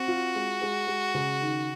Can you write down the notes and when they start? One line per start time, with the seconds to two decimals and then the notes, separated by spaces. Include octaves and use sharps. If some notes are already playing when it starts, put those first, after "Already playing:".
Already playing: C4 F#4
0.08 F4
0.35 G#3
0.61 G#3
0.87 G#3
1.14 C#3
1.41 D#3